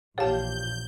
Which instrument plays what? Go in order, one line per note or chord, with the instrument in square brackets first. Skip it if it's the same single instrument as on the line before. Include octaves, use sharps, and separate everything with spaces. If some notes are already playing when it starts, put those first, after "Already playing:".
[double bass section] A#1 E2 A#2 [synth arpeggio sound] G4 F5 [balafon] C#5 A5 [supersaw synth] G6